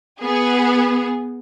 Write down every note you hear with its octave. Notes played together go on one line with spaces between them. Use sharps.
B3 G#4